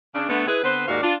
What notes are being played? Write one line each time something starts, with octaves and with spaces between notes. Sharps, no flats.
C#3 D4
D3 A3 B3
E4 G#4 B4
D3 B3 C4 B4 C5
D#2 G#2 A#3 F#4 D5 F5
D4 F4